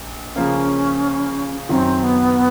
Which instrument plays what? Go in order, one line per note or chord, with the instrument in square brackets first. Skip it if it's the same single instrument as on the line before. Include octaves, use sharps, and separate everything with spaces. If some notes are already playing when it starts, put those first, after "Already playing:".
Already playing: [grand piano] A#1
[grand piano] C#3 F3 A#3 [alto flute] C#4
[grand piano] F#2 D#3 F#3 [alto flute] C4
[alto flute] B3